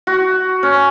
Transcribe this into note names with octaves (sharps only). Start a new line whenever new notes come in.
F#4
C#4